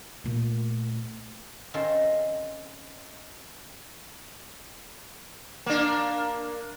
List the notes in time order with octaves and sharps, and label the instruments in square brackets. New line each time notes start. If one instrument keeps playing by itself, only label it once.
[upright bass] A#2 A3
[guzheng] D#3 C4 C#4 F4 A4 C5
[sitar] A#3 D4